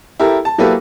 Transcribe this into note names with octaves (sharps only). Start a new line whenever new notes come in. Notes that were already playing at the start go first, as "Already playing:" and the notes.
E4 G4 A4 A#4
A5
F#3 A#3 E4 G4 A4 B4